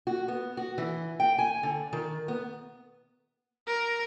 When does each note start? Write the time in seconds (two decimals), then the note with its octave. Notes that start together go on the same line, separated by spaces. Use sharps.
0.07 F#4
0.28 B3
0.57 F#4
0.78 E3
1.20 G5
1.38 G#5
1.63 D3
1.93 D#3
2.28 B3
3.67 A#4